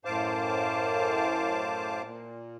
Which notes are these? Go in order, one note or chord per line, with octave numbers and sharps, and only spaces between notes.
F#2 A2 C5 F5 A5 D6
A#2